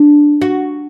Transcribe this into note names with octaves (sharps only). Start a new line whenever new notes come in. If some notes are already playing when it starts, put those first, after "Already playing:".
Already playing: D4
F#4